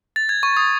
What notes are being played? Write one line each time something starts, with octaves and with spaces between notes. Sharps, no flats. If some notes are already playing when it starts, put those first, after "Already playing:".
A6
G#6
C#6
D#6